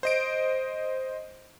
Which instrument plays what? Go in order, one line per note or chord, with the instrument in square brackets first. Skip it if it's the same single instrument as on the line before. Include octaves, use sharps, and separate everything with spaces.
[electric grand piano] C5 D#5 D7